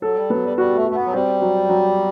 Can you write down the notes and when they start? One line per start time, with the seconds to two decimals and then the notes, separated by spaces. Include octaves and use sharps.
0.02 F#3 A4
0.16 G3
0.30 F#3 B3
0.45 G3
0.57 G3 F#4
0.76 A3
0.85 F#4
0.91 A3
0.95 B3
1.06 F#3
1.13 G3 C4
1.41 F#3
1.69 F#3